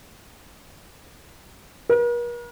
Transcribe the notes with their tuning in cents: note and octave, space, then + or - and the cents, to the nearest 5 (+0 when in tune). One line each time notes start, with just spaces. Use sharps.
A#4 +45